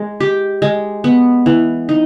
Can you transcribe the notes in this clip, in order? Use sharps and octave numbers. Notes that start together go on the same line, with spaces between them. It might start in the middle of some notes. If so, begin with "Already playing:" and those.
Already playing: G#3
G4
G#3
B3
E3
D#4